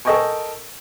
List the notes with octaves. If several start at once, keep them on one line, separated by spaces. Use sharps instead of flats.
A4 A#4 D#5 G5 G#5 C#6